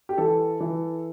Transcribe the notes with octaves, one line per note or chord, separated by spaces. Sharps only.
G4
E3 A4
E3